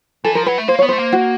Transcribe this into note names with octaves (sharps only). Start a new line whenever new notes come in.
E3 A4
F3 A#4
F#3 B4
A3
A#3 C5
B3 C#5
A3 C5
A#3
F#4